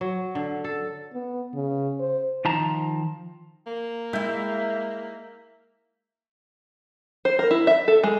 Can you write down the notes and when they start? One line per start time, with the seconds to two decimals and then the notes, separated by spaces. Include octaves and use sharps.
0.01 F#3
0.35 D3
0.64 A4
1.13 B3
1.54 C#3
2.00 C5
2.45 D#3 F3 A5 A#5
3.67 A#3
4.13 G#3 E4 E5 G5
7.25 C5
7.39 A#4
7.51 E4
7.67 E5
7.88 A4
8.04 G#3